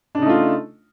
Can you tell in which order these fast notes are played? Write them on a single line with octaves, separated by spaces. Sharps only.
D4 C#3 D#4 A3 F4